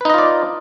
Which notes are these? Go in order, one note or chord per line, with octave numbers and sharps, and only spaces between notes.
D#4 F4 B4 D5 D#5